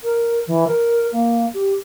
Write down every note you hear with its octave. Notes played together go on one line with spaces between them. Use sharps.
A#4
E3
A#4
A#3
G4